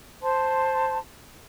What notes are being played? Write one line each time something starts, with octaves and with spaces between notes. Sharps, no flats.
C5 A5 C6